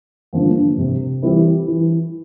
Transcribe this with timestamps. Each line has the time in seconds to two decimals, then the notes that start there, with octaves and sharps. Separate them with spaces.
0.33 G2 D3 F3 A#3
0.78 C3
1.22 E3 G3 C4 E4
1.68 E3